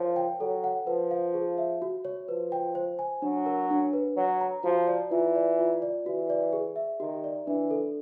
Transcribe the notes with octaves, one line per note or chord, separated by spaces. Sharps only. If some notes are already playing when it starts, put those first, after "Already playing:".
Already playing: F3 A#4 C#5
G5
F#3 A4
F#5
F3 B4
F5
G#4
E5
F#4
C#5
F3 B4
G5
C5
G#5
F#3 D4
A#4
D4
B4
F#3 C#5
A#5
F3 F#4
D5
E3 F4
D5
F4
D5
E3 F#4
D5
G#4
E5
D#3 G4
D5
E3 D4
A4